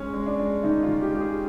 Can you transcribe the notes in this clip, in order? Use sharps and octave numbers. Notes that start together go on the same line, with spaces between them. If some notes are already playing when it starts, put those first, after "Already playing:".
Already playing: G#3 C#4
G#3
D4
G#3
D#3 D#4
F4
D#3
G4
G#3 G4
G#4